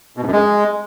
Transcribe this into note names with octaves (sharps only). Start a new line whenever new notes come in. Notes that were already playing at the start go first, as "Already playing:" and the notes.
B2
G#2
F#2
G#3